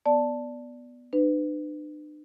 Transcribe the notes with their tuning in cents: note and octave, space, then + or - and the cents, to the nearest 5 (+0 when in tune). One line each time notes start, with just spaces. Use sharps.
B3 +0 D5 +0 A5 +0
D4 +45 B4 +25